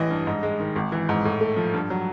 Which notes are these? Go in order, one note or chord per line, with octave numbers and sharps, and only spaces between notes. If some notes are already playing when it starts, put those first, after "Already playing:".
Already playing: A1 E3 D#5
G2
G#2
G#3
D#3
G#1
E3
G#2
A2
A3
F3
G2
F#3